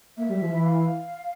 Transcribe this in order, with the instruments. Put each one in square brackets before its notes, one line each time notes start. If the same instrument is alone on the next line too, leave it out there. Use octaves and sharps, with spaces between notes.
[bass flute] A#3 [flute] E5
[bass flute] G3
F3
E3
[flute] F5